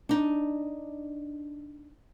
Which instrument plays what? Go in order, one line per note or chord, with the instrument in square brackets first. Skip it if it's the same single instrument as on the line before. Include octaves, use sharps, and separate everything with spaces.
[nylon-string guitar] D4 D#4